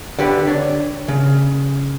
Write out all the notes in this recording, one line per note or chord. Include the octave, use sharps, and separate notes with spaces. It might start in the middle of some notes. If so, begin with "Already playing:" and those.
D3 G4 B4
D4 C#5
C#3